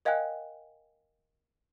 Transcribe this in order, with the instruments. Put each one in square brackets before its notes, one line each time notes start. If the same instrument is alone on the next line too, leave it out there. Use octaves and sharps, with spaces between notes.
[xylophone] A#4 D#5 F5 G5 G#5 F#6